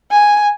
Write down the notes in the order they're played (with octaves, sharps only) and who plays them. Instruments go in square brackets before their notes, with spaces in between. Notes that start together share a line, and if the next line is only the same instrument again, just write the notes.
[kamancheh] G#5